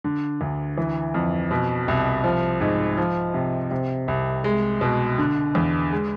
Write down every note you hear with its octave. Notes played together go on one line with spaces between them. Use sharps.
D3
D2
E3
F2
B2
C2
F3
G#2
F3
C3
C3
C2
G#3
B2
D3
E2
G#3